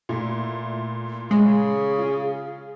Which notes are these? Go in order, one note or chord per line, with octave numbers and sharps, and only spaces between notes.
A#2 A3 E4
C#3 G#3 G#4
F4